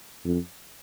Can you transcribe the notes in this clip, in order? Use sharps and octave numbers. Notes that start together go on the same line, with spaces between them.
F2